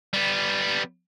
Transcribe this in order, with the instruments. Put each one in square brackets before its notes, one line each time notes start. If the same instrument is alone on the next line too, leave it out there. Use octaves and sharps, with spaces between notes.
[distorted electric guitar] G3 B3